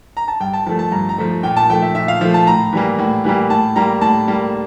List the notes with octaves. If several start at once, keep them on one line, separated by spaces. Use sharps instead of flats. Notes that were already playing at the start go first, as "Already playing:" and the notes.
A#5
A5
G2 G5
A5
F3 A3 A5
A5
G2 A#5
A#5
F3 A3
A#2 G5
A5
F3 A3 G5
E5
A#2 E5
F5
F3 A3
A5
A2 A#5
E3 G3 A#3
A2
E3 G3 A#3
A2 A5
G3 A#3 A#5
A2 A5
G3 A#3